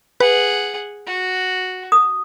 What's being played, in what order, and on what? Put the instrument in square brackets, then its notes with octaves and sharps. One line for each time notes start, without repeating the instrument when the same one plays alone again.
[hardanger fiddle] G#4 F#5 [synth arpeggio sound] B4
[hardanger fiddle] F#4
[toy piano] D#6